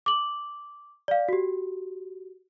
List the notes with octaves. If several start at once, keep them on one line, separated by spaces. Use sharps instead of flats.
D6 F#7
D5 F5
F#4 G4